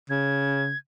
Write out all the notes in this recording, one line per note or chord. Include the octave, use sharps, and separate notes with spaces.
C#3 G#6